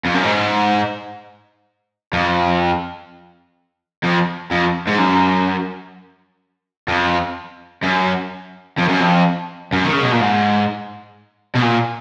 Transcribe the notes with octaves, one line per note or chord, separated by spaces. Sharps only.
F2
F#2
G#2
F2
F2
F2
G#2
F#2
F2
F#2
F2
F#2
F2
F#2
D#3
C#3
B2
A#2
G#2
B2
A#2